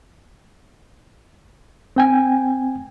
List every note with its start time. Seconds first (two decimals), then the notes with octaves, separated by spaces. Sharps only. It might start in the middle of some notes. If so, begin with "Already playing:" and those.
1.96 C4 G5 G#5